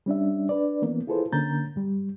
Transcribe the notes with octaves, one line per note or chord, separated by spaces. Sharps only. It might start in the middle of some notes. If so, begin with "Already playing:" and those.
G3 C#4 D4 E5
D4 B4 D5
E3 A#3 B3 C#4
E4 F4 G#4 A4 B4 C5
D3 A#3 C#4 A#5 G6 A6
G2 G3